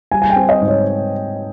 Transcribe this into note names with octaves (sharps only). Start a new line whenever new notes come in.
G3 G#5
G#5
G5
C4
D#5
G#2
C#5